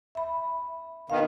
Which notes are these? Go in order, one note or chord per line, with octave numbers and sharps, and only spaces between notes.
E5 B5
B2 D#3 F5